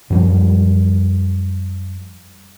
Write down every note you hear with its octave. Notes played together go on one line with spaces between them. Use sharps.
F#2 F3 G3